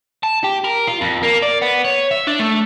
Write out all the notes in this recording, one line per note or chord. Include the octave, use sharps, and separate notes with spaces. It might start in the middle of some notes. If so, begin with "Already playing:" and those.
A5
G4
A#4
F4
F2
A#3
D5
B3
C#5
E5
D4
A3